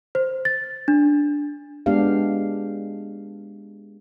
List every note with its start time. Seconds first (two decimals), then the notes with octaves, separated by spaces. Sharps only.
0.15 C5
0.45 A6
0.88 D4
1.86 G#3 B3 D4 G4 F5